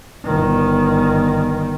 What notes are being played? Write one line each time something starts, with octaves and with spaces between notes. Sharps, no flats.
G1 D#3